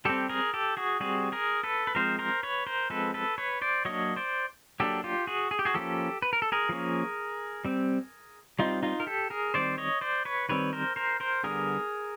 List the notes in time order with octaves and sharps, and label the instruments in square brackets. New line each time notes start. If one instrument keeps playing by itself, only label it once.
[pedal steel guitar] G3 C4 G4 A4
G#4 A#4
G4 A4
F#4 G#4
G3 C4 F#4 G#4
G#4 A#4
A4 B4
B4
F3 G#3 C4 A#4 C5
A#4 C5
B4 C#5
A#4 C5
F3 G#3 C4 A4 B4
A4 B4
B4 C#5
C5 D5
F#3 A#3 D4 C#5 D#5
C5 D5
F#3 A#3 D4 G4 A4
F4 G4
F#4 G#4
G#4
G4
F#4 G#4
F3 A#3 C#4 G4 A4
B4
A#4
A4
G#4 A#4
F3 A#3 C#4
G3 C4
G3 C4 D#4 F4
D#4 F4
A#4
G4 A4
G#4 A#4
D#3 G3 C4 C5 D5
C#5 D#5
C5 D5
B4 C#5
D#3 G3 C4 B4 C#5
A#4 C5
A#4 C5
A#4 C5
D3 G3 B3 D4 G#4 A#4